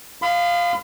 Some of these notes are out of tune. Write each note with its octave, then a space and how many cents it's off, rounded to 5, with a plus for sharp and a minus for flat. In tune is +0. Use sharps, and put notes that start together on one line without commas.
F5 +0 B5 +45 D#6 -35